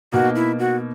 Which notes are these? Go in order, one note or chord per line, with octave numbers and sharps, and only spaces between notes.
B2 A#3 D#4 F#4
E4
F#4